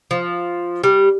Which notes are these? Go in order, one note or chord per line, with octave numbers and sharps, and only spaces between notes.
F3
G3